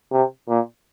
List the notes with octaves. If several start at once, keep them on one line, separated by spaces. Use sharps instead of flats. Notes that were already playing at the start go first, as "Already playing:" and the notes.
C3
A#2